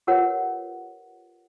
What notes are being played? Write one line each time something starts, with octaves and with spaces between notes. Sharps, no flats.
F4 G4 A#4 B4 C#5 F#5